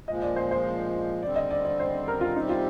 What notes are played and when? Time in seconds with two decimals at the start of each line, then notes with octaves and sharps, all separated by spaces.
0.08 A#2 F3 G#3 D#5
0.22 D5
0.36 C5
0.51 C5
1.22 D3 G3 C4 D5
1.36 D#5
1.51 D5
1.65 D5
1.79 C5
2.08 A#4
2.21 F4
2.36 C3 G3 C4 D#4 G4
2.49 F4